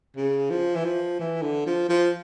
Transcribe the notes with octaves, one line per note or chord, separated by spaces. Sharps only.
C#3
F3
E3
F3
E3
D3
F3
F3